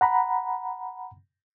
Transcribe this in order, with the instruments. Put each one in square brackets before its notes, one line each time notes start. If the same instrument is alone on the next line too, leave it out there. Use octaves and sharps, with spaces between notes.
[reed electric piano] F#5 A#5 B5